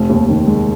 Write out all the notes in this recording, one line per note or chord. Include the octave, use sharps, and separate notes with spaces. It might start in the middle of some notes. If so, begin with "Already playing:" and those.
Already playing: F1
D#2
D#3
G#3